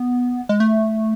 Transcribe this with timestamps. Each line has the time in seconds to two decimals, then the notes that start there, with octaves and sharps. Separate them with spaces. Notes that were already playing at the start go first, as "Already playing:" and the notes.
Already playing: B3
0.49 G#3
0.60 A3